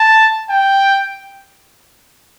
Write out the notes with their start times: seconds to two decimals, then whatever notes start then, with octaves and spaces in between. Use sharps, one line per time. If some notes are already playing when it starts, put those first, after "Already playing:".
Already playing: A5
0.50 G5